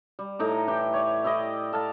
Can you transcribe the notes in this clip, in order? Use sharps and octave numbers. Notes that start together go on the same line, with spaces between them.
G3
A2 D#4 A#5 D6
E3 G4 G5
C#5 D5
E4 G4 D5 D#5
A4 F5 A5